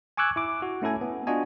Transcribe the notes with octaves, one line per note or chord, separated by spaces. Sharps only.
G#5 C#6 D6 E6 F#6 G#6
E4 D6
F#4
A3 C#4 E4 A4 G#5
B3
D4 F4 F#4 D#5 G#5